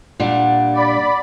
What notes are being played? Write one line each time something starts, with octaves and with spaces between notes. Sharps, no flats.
A#2 G3 D4 F#5
D5 B5